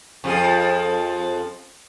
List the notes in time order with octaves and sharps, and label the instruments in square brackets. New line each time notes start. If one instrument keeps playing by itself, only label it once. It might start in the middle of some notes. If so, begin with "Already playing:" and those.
[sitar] F2 F3 G#4